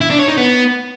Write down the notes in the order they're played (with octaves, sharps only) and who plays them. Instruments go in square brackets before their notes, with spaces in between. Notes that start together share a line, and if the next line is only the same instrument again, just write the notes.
[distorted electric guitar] E4
D4
C#5
D#4
B3